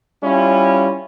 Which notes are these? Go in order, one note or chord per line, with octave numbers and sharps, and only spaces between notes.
G3 C#4 E4 F4